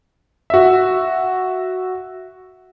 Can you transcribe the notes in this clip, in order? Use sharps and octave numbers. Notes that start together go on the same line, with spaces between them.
F#4 E5